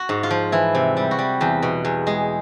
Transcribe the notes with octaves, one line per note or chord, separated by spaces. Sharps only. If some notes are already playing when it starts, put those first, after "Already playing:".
Already playing: F#4
G#2
F4
F3
E3 E4
C3
G3
F#4
G3
E2 G4
B2
E2
G#3